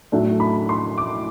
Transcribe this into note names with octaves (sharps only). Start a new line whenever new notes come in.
A2 F#3 A3 D4
B5
C6
D6